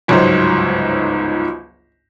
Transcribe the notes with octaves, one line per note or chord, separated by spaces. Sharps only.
G1 C#2 G#2 F#3 D#4 C5